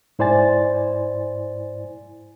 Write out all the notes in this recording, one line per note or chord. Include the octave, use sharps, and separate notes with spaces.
G#2 E4 C5 D5 G#5 A6